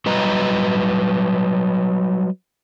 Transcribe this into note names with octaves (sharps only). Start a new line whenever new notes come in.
F#3 G3 B4 D#5 A#5